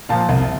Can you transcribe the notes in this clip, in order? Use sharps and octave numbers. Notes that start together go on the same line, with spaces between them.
A#2 F3 F5 A5
C2